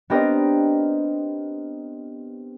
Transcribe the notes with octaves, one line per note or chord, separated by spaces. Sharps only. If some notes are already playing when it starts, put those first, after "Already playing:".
B3 C4 D4 G4 A#4 D#5